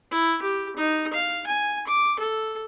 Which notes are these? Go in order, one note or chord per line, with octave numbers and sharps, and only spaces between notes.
E4
G4
D#4
F5
G#5
D6
A4